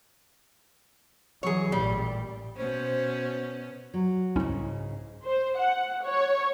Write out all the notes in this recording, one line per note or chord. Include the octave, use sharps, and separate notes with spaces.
E3 F#3 G#4 C#5
A1 A#2 G3
B2 C#4 C5
F#3
C2 G#2 C#3 C#4 E4
C5
F#5
C#5